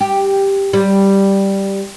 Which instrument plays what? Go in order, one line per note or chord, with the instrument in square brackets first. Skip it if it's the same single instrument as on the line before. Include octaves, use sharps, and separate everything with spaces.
[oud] G4
G3